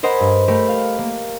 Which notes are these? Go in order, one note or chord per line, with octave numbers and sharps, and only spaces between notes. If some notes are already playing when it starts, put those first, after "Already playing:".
A#4 C5 D#5 F#5 G#5 B5
G2
A3 G4 A#4 B5
F5
A#3